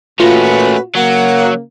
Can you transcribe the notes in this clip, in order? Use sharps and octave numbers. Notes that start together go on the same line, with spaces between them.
A#2 A3 C#4 F4 F#4 B4 A#6
C#3 F#3 A#3 F#5